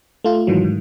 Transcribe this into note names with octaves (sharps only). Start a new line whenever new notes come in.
A3 F4
G#2 D#3 E3 F#3
G#2